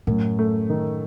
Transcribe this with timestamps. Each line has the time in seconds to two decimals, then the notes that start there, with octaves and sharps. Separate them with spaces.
0.07 F#2 A2
0.39 A3
0.70 D#3